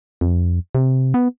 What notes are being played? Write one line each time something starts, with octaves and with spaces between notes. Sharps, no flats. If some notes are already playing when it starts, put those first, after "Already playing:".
F2
C3
B3